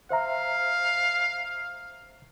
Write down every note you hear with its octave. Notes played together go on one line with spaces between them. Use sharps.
C5 E5 F5 A#5